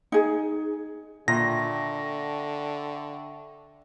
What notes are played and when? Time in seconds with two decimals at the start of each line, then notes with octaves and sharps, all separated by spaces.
0.12 D#4 G#4
1.28 A#2 D3 E5 G5 C#6 A#6